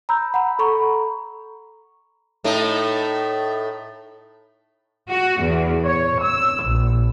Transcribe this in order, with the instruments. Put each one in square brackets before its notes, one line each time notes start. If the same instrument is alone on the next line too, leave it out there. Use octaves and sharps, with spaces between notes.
[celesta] A#5 B5 E6 G6
F#5 A#5 B5
A4 A#5 B5 C#6
[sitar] A2 A3 D#4
[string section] F#4
E2
C#5
E6
A#1